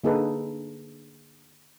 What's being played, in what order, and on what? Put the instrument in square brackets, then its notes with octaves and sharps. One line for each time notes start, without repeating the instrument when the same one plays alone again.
[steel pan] D3 A#3 D#4 G#4 A4 B4